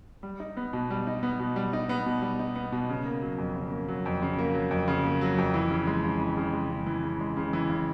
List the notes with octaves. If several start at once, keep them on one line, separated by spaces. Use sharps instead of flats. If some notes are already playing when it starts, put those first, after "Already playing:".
G3
D#4
B3
B2
G3
D#4
B3
B2
G3
D#4
B3
B2
G3
D#4
B3
B2
C#3
A#3
F#3
F2
C#3
A#3
F#3
F2
C#3
A#3
F#3
F2
C#3
A#3
F#3
F2
E3
C#3
G#3
C#3
E3
C#3
G#3
C#3
E3
C#3
G#3
C#3
E3
C#3